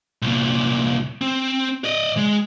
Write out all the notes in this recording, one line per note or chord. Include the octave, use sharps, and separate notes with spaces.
C2 A#2
C4
D5 D#5
G#3